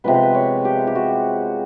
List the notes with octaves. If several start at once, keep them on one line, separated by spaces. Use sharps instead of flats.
C3 F3 G#3 B3 B4
C5
B4
C#5
G4
G4
F#4